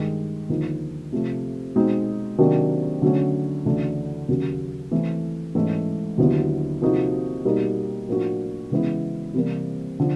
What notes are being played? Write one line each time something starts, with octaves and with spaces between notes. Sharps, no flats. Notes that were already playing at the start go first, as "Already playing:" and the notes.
Already playing: G2 D#3 G#3
D#2 D3 F3 A#3 D#4
C3 F3 A3
B2 G#3 C4 D#4 F#4
C3 D#3 F#3 A#3 D4
D3 F#3 A3 C#4
D2 C#3 E3 A3 D4
D#2 C#3 F#3 A#3
E3 A3 C4
G#2 E3 A3 C#4
D#2 D3 F#3 B3 E4
C3 F3 A#3 D#4 F#4
B2 G3 A#3 D#4 G4
A2 F3 A#3 D4 F#4
C#3 E3 G#3 B3 E4
C3 E3 G3 A#3
D3 F3